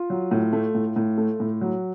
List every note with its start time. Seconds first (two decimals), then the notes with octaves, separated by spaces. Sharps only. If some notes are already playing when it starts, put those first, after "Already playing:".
Already playing: F4
0.10 F#3
0.31 A2
0.53 A3
0.75 A2
0.96 A2
1.18 A3
1.40 A2
1.61 F#3